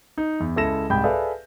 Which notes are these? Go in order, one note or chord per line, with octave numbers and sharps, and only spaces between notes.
D#4
E2
C#2 E4 A4 A#6 E7
C2 G#2 G5 B5 G6
G#4 A4 B4 D5 E5 F5